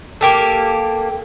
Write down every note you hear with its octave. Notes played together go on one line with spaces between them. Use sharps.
A#3 G4 A4